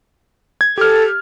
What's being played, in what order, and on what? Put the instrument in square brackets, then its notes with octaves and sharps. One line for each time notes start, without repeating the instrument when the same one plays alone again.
[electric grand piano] G#6
[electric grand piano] G4 F6 [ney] A4